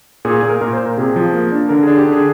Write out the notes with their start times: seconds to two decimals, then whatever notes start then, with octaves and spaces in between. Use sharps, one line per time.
0.25 A#2 G#4
0.37 G#4
0.43 A#2
0.49 A#4
0.61 A#2 A#4
0.73 C5
0.79 A#2
0.86 A#4
0.97 C3 G#4
1.16 F3
1.34 A#3
1.52 D4
1.69 D3 A#4
1.83 D4 G#4
1.97 G4
2.06 D3
2.12 G#4